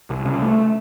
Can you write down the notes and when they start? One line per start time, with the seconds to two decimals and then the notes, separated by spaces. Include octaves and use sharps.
0.10 C2
0.25 C#3
0.42 A3